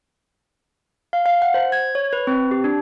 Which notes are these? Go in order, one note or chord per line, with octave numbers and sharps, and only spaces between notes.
F5
F5
F#5
C5
G#6
C#5
B4
C4
G4
D4